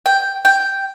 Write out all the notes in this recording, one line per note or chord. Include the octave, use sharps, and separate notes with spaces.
G5
G5